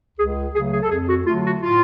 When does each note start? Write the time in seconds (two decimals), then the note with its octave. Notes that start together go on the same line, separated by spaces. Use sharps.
0.18 C#2 G#4
0.54 C#3 F#3 A3 G#4
0.72 G#4
0.82 A4
0.90 F2 G#4
1.09 F#4
1.27 D3 F#3 A3 F4
1.45 F#4
1.63 A2 F4